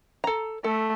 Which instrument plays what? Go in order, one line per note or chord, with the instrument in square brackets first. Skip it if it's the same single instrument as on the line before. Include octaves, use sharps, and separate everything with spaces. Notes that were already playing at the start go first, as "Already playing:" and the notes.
[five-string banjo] A4 A#5
[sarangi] A3 [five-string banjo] A4